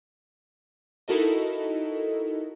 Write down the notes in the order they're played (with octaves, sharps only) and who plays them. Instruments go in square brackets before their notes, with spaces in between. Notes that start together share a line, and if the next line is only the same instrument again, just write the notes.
[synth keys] D#4 E4 F#4 A4 A#4 D#5